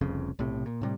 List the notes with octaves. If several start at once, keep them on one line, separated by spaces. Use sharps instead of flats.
F1 C2 F2 C#3
B1 A2 C3
A#2
A2 C3 G3